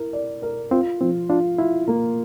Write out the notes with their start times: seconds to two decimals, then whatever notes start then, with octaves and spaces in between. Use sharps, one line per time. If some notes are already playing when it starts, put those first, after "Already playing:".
Already playing: E4 A#4
0.13 D5
0.42 A#4
0.71 C4 F4
1.01 F3 C4
1.29 D4 F4
1.58 E4 F4
1.88 A#3